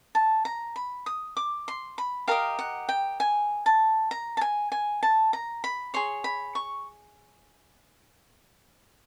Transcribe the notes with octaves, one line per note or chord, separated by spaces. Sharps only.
A5
A#5
B5
D#6
D6
C6
B5
G4 A#4 D#5 F5
F#5
G5
G#5
A5
A#5
A5
G#5
G#5
A5
A#5
B5
G#4 C#5 C6
B5
C#6